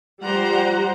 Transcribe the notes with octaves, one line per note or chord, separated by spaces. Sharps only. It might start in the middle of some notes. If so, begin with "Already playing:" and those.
F3 G3 G4 C5 F#5 A#5